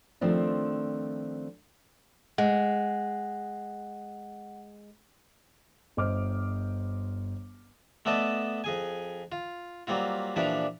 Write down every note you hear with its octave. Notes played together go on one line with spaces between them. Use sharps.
D#3 F3 A3 C4 D4
G#3 F#5
G1 C5 D#5 D6 F6
A3 B3 A4 D5 D#5 A5
F2 G#4 G#5
F4
F#3 G3 A#3 C4 F4
A#2 E3 F3 D4 G4 D5